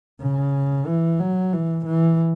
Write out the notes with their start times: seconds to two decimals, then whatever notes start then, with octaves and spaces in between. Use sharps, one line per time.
0.22 C#3
0.87 E3
1.20 F#3
1.53 E3
1.86 E3